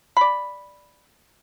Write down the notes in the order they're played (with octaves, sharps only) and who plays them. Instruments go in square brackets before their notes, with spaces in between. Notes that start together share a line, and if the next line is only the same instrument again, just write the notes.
[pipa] D5 B5